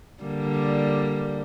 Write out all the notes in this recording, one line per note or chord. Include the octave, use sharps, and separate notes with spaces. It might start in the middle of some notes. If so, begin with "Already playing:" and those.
D3 G3 A#3